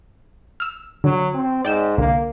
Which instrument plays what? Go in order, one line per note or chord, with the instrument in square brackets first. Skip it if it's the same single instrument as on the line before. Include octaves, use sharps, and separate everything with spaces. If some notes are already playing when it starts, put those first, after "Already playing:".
[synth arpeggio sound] E6 F6
[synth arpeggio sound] D3 [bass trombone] F#3
[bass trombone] C4
[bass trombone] G#2 [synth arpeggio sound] D5 G5 E7
[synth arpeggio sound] C2 D3 [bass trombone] A#3